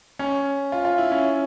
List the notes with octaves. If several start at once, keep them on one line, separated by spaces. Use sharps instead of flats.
C#4
F4
F4
E4
C#4